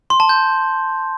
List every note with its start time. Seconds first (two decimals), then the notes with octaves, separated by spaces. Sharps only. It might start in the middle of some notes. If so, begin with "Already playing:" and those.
0.10 C6
0.20 A5
0.29 G6